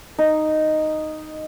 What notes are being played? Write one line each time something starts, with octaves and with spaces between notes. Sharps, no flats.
D#4